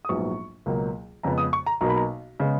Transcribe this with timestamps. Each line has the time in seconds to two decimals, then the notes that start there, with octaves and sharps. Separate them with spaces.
0.05 D#6
0.09 A#1 G#2 F#3 B3 C#6
0.66 C#2 B2 F#3 A#3
1.23 F2 C#3 G#3 B3 A#5
1.38 D#6
1.53 C#6
1.66 A#5
1.81 B1 B2 A#3 A#5
1.89 B5
1.96 A#5
2.40 C#3 G#3 B3